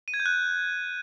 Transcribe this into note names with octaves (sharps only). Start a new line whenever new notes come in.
D#7
G#6
G6
F#6